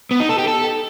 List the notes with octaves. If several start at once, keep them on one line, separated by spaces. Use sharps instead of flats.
B3
D#4
A4
G4
A4